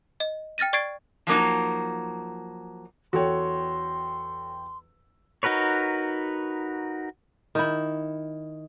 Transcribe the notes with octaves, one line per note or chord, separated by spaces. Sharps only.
D#5
G5 F6 A6 A#6 D#7
D5 C#6 G#6 A6 C7 D7
F3 F#3 A#3 D#4
E2 F#4 A4 C#5 G5 C6
D#4 F#4 A#4 B4 C#5
D#3 E4